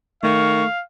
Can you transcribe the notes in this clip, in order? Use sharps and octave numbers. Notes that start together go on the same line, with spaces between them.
D#3 A3 F5 C#6